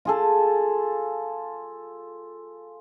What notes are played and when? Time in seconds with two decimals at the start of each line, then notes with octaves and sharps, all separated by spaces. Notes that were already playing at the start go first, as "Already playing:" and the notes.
0.05 F4 G#4 A4